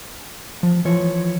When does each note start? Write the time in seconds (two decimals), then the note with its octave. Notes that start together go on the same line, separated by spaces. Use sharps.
0.63 F3
0.85 E3 F3 C#5